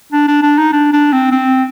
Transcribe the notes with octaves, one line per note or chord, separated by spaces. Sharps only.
D4
D4
D4
D#4
D4
D4
C4
C4